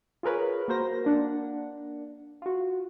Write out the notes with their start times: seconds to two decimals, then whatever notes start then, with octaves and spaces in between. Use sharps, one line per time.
0.23 F4 G#4 A#4 B4 C#5
0.68 A#3 F#4 A#4 C5 A#6
1.05 A#3 D4 F#5
2.42 F4 F#4